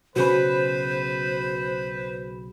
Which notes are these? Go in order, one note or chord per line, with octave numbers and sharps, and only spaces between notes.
B1 C#3 F#4 G#4 B4 C5 B5